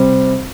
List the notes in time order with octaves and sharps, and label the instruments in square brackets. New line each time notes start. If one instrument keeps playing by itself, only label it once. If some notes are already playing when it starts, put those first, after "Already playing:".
Already playing: [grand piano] C3 G3 C4